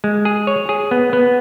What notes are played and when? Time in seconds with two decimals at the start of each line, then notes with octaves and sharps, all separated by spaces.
0.04 G#3
0.25 G#4
0.47 C#5
0.69 G#4
0.91 B3
1.13 B3